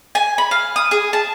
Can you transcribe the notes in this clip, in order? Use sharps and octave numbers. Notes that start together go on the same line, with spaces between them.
G#5
B5
F5
D#6
G#4
A5